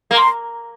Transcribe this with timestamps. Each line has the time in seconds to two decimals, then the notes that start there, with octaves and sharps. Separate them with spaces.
0.11 A#3
0.17 C6